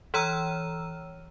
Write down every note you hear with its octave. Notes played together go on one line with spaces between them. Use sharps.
E3 C#5 A#5 E6 F6 D#7